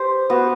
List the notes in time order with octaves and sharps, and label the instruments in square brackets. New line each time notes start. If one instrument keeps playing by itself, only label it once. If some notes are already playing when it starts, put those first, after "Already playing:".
Already playing: [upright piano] G4 [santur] C5
[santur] B3 [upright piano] F#4